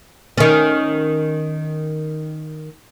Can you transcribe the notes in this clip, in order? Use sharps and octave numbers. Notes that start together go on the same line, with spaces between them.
D#3 C#4